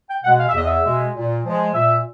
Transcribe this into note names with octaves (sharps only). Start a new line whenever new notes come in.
G5
B2 G#3 F#5
F5
E5
E2 D#5
E5
B2 G#3
A#2
F3 G#3
A#2 E5